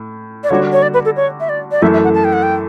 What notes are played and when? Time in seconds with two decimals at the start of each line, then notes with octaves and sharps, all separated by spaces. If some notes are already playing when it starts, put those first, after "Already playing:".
Already playing: A2
0.44 D5
0.50 D3 G3 D4 F#4 C#5
0.73 C#5
0.82 D5
0.94 B4
1.05 A4
1.16 C#5
1.40 E5
1.49 D5
1.71 D5
1.82 F#2 E3 A3 E5
1.93 E5
2.04 F#5
2.14 A5
2.24 G5
2.33 F#5
2.43 G5